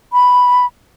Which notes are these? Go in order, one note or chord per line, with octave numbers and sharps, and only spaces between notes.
B5